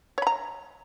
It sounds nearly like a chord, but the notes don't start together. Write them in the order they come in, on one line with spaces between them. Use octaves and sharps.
C#5 B5 A#5